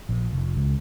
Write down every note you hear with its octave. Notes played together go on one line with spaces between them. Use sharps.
A#1
F1
C#2